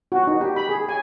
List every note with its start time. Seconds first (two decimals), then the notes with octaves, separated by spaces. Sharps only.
0.12 F#4
0.27 D#4
0.41 G4
0.56 B5
0.69 G#4
0.89 G#5